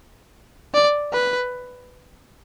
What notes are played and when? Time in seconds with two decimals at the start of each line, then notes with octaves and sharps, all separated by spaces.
0.74 D5
1.12 B4